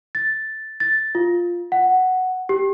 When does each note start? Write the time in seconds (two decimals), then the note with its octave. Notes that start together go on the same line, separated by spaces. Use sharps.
0.15 A6
0.80 A6
1.15 F4
1.72 F#5
2.49 G4